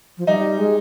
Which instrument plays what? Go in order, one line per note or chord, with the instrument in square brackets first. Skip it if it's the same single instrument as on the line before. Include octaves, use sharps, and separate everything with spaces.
[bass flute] F3
[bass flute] G3 [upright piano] D#4
[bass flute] G#3